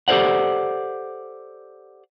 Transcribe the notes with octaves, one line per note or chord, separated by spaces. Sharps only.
G4 A4 A#4 C5 D5 F#5